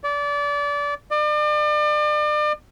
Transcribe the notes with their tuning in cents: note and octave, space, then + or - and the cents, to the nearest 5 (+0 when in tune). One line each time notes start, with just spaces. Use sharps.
D5 -25
D5 +40